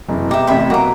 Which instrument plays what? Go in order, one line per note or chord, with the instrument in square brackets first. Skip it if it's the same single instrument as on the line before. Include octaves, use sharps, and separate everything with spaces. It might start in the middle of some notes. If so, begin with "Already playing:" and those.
[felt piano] F#1 C3 E3
[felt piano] B2 [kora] G4 [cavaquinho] E5 A#5
[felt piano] A1 C3 C6 [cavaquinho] E5 G5 B5
[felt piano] B2 [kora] F#3 A#3 [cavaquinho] A#5 D6